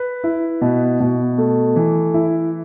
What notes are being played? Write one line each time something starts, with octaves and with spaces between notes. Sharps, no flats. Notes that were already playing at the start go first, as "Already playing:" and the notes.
Already playing: B4
E4
B2
B2
A3
E3
E4